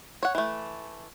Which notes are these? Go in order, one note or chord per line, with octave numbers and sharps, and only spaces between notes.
C#5 F#5
E3 A3